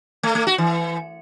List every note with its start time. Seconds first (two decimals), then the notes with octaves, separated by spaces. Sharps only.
0.23 A3
0.35 A3
0.47 F#4
0.58 E3